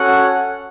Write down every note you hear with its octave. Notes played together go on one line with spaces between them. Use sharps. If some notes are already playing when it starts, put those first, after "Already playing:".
Already playing: C#4 F#4 A4 C#5 F#5